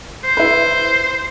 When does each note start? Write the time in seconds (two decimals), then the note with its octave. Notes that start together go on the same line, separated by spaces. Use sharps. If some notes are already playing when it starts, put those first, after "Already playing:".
0.24 C5
0.37 E4 B4